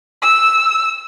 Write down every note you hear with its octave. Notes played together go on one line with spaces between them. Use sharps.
E6